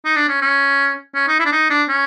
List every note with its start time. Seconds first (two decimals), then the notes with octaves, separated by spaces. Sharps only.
0.05 D#4
0.16 D4
0.29 C#4
0.42 C#4
1.15 C#4
1.28 D#4
1.39 E4
1.46 D4
1.52 D#4
1.70 D4
1.89 C#4